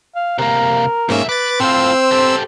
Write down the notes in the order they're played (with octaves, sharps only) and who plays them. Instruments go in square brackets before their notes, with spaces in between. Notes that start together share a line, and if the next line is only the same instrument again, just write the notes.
[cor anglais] F5
[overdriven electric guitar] C3 A#3 [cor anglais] A#4
[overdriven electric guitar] B1 E5 [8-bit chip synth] G#2 A#3 C#4
[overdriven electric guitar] B4 [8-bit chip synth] D6 A6
[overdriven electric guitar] A2 F4 [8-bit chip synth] C4 E6 [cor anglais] C5
[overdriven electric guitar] G4 A4